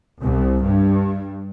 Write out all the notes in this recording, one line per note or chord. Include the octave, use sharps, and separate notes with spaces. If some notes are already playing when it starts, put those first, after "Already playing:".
C2
G2